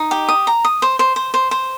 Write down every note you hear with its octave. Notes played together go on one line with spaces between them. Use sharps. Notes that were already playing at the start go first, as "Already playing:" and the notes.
Already playing: D#4
G4
D#6
A#5
D#6
C5
C5
C5
C5
C5